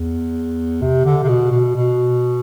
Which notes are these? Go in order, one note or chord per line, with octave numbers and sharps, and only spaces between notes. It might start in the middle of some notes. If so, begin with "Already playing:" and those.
Already playing: E2
C3
D3
C3
B2
B2
B2